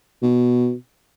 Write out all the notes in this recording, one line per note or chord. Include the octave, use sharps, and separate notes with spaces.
B2